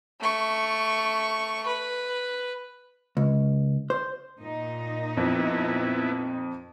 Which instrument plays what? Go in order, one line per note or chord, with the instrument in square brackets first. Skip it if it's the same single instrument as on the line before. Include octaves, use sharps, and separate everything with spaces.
[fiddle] A3 C#6
B4
[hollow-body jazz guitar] C#2
C5
[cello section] A#2 D#4
[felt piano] F2 [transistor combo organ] B3 E4